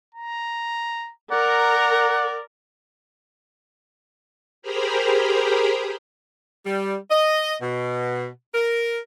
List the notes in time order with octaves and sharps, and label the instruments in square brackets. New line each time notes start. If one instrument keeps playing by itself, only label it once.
[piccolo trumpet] A#5
[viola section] A#4 [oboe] D5 [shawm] F#5 [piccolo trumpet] A#5
[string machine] G4 G#4 A#4 C5 A#5 B5
[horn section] G3
D#5
B2
A#4